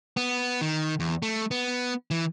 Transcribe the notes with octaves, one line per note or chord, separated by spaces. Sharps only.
B3
D#3
E2
A3
B3
E3